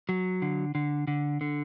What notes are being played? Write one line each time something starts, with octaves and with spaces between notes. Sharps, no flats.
F#3
D3
D3
D3
D3